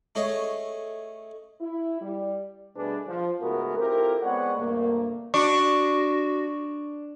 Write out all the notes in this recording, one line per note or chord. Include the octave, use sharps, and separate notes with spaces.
A3 C#4 G#4 C#5 D#5
E4
G3
B2 G3 A3 D4 G#4 B4
F3
C#2 G#2 A3 B3 F#4 A#4
C4 E4 F4 G4 A4 A#4
G#3 B3 C4 C#5 D5 F#5
D2 G2 C3 A3 A#3
D4 F#4 C#6